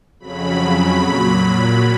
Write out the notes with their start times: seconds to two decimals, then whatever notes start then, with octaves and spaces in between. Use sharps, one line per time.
0.20 F2 C#3 F#3 B5
0.95 A#2 F#3